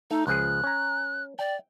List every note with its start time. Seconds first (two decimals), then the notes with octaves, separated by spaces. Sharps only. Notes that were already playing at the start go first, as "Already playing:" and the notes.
0.11 A3 D#4
0.27 C#2 F3 G#4 F#6
0.64 C#4 A#5
1.39 D5 G5